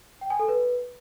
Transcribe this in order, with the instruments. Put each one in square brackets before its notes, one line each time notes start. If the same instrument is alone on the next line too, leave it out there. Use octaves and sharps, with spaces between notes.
[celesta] G5
G#5
A4
B4